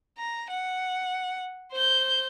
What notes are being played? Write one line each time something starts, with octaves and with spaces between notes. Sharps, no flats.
A#5
F#5
C5 G6